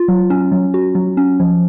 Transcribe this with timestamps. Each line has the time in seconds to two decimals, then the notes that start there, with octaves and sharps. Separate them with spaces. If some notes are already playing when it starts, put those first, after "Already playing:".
Already playing: F4
0.08 F#3
0.30 C#4
0.52 F#3
0.74 F#4
0.95 F#3
1.17 C#4
1.40 F3